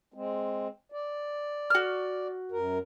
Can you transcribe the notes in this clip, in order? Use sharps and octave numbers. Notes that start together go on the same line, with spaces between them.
G#3 C4
D5
F#4 F6
F#2 A#4